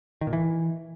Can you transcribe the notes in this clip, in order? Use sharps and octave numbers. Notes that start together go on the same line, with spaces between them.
D#3
A#2
E3